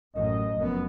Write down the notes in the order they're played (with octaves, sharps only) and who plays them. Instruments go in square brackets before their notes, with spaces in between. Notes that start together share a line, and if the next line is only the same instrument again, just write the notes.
[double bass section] A1 F#2 A2 [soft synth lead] D#5
[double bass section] F1 F#2 B3